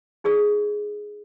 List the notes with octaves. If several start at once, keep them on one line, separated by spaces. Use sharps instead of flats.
D#4 G#4 D5 D#6